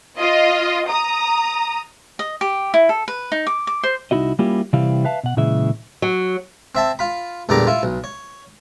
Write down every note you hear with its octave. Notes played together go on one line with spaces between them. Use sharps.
F4 D#5
A#5 D#6
D#5
G4
E4
A4
B4
D#4
D6
D6
C5
C2 D#4 E4 F#4 D#5
G3 A#3 C#4 E4 F4 G4
C3 E3 G3 C4 E4 F5
B4 E5 F5 A5
B2 F#5
A#2 C#3 E3 G#3 E5
F#3
C4 E5 A5
F4 B5
E2 A#2 D3 G3 A#5 D6
E4 F4
B1
C#5